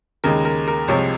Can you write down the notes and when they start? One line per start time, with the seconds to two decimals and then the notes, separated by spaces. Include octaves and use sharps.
0.24 D#2 C#3 G#3 A#4
0.45 A#4
0.68 A#4
0.88 C2 C3 F3 G#3 C#5